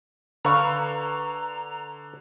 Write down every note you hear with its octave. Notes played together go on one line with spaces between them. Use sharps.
D3 B4 F5 A#5 C#6